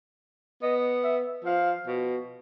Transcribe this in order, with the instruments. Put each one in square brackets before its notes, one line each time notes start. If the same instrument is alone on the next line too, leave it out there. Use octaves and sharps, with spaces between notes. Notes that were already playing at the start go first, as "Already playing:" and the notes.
[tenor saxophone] B3 [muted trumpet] D#5
[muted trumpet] E5
[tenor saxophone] F3 [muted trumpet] F5
[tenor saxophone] B2